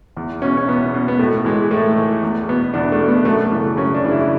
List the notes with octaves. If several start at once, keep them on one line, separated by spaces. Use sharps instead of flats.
E2
B2 C#4
C#4
E2 B3
B2
B3
A2 A3
E3 G#3
A2 A3
E3
E2
B2 B3
E2 D4
A3
B2
B3
F#2 A3
C#3 E3 A3
F#2 C#4
D4
C#3 E3
E4